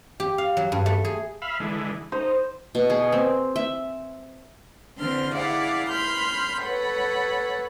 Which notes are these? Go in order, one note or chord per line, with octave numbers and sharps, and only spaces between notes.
G4
F5
F#3
G2
A3
G#4
E5 F5 B5
D3 E3 G#3
D#4 C5
B2
G#4
C4
E5
D3 E3 C4 D4 C6 F6
E4 G#4 D5 F5 F#5
B5 C6 F6 G6
A4 B4 C#5 F#5 B5